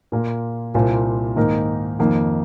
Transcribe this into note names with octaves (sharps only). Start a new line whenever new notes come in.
A#2 A#3 F4
C2 A#2 A#3 F4 C5
G#2 D#3 A#3 D#4 A#4
F2 D#3 A#3